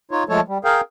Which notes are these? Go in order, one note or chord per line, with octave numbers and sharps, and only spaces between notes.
D#4 F4 C#5
F3 G#3 A3 A4 C#5
G3
G#4 A#4 F5 G5